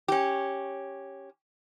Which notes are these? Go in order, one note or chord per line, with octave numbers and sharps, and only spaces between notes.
C#4 G4